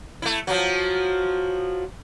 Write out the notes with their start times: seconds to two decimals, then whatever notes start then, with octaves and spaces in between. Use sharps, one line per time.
0.22 A3 E4
0.47 F3 F#3